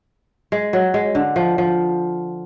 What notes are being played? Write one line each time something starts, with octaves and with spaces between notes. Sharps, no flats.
G#3
F#3
G#3
D3
F3
F3